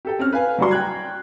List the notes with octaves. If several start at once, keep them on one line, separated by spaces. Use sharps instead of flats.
G4 A4 G5
C4 C#4 F6
B4 F5 G#5
F#3 G3 F#4 C6
G5 A#5 F#6 G#6